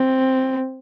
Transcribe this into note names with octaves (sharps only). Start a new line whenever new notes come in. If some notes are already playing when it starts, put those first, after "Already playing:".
Already playing: C4